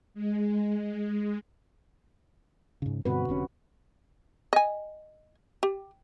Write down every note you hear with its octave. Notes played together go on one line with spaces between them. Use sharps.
G#3
G#2 C#3
G2 B2 D3 C4 F#4 B4
F1 C3 C#4
D#5 G#5
G4